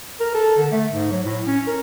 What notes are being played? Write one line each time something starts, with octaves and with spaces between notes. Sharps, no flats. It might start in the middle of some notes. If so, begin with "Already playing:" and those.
A#4
A4
D3
A3
G#2
F#3
A2
C#4
A#4